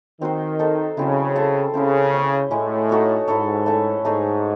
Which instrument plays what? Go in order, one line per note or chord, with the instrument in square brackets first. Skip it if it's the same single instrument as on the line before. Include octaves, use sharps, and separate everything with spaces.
[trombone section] D#3 [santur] C4 F#4 C5
[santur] D#4 A4 C5
[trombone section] C#3 [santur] F#3 C4 E4
[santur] E4 A4 C5 E5
[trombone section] C#3 [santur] C4 E4 C5
[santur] C#4 G#4 C5
[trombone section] A2 [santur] G#3 C#4 E4
[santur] D#4 F#4 A4 C#5
[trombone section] G#2 [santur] E4 A4 C#5
[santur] A3 C#4 E4
[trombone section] G#2 [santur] A3 D#4 G#4 C#5